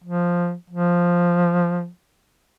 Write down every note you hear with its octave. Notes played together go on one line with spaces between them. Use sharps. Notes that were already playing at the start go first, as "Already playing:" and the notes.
F3
F3